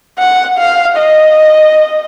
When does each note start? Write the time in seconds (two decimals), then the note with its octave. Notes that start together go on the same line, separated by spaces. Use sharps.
0.19 F#5
0.59 F5
0.98 D#5